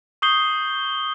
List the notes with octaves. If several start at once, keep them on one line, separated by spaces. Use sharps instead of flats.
C#6 D#6 G6 C7 G7